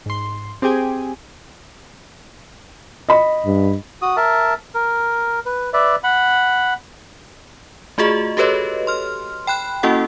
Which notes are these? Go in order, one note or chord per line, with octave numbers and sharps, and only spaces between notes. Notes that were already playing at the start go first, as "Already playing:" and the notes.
G#2 C6
C4 G4 G#4 G5 G#5
D#5 B5
G2
F#4 D#6
A#4 E5 A5
A#4
B4
B4 D5 E5
F#5 B5
A3 F4 F#4 G#4 D#5
F#4 G4 A4 B4 C#5 D#5
C6 F6
G5 B5 F#6
A#3 C#4 E4 F#4 A4 F#5